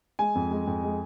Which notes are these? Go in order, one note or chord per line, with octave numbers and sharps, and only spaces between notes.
G#3 G#5
F2
G#3
F2
G#3